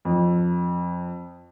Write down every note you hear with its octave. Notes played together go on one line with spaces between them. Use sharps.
F2